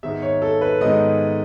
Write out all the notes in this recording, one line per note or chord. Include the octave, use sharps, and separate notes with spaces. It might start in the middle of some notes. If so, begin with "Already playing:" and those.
G#2 D#3 G#3 B3 E5
C#5
A4
B4
G#2 D#3 G#3 B3 D#5